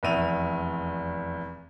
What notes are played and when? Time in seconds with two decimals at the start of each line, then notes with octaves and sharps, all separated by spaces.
0.03 F1 E2 E5 D#7 F7